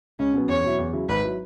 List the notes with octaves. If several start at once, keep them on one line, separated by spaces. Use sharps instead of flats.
C#2 C#4
B2 F#3 B3
E2 C#5
B2 F#3 E4
E2
C#3 F#3 E4
G#1 B4
F#3 E4